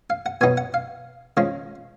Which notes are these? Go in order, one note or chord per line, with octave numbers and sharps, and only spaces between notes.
F5
F#5
B2 F#3 B3 D#4 G#5
F#5
F5
C#3 F3 G#3